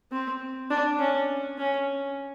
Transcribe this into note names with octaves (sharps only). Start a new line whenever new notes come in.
C4
D4
C#4
C#4